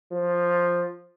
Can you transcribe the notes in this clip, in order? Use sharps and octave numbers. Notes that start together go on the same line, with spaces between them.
F3